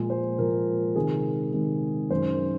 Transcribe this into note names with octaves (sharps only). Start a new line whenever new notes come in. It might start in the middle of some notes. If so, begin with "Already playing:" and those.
Already playing: A#2 F3 G#3
C5
A#2 F3 G#3 A#4
C3 D#3 G#3 G#4
C3 D#3 G#3
F#2 D#3 G#3 C5